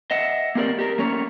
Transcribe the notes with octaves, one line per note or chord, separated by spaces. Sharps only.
D#5 E5 F#5
A#3 C4 G4 A#4 D5 D#5
G4 A#4
A3 A#3 C#4 C#5